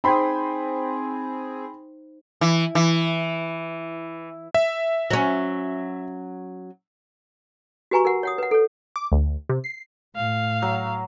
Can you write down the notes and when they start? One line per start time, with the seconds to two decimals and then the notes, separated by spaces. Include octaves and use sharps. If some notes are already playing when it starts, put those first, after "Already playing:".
0.04 C4 D#4 G#4 C5 G5 B5 C6
2.41 E3
2.75 E3
4.55 E5
5.10 F#3 C#4
7.91 F#4 G4 B4 G#5 A#5 C#6
8.05 A#4 F#5
8.23 C#5 F#5 D#6
8.38 B4 F#5
8.51 A4 C#5
8.96 D6
9.12 D2
9.49 C3
9.64 C7
10.16 A2 F5
10.62 F#3